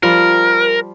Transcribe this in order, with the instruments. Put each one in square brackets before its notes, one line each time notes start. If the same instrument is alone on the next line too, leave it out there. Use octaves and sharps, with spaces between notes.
[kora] F3 G3 F4 [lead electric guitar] A#4